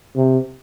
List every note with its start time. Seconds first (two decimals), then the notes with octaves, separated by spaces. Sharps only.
0.16 C3